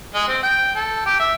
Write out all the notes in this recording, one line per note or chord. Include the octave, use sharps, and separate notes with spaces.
G#3
C4
G5
A4
G4
E5